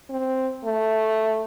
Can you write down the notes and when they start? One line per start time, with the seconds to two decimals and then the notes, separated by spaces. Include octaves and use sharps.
0.10 C4
0.65 A3